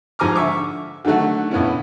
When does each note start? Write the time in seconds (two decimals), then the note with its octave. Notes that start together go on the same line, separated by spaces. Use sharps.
0.19 G#2 F3 G#5 A#5 D6 F6
0.36 D3 E5 C#6 D6
1.05 D3 D#3 F#3 A3 F#4
1.51 A#1 B3 C#4 E4